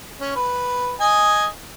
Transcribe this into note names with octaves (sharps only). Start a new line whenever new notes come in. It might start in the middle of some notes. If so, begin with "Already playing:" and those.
C#4
B4
D#5 G#5